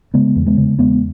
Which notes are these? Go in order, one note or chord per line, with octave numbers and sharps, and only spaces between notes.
C#3 G#3 B3
E2
G#3 B3
C#3
E2 G#3 B3